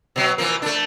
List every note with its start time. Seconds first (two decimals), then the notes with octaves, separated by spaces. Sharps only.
0.16 B2 F#3
0.38 E3 F3 A#3
0.62 A3 D4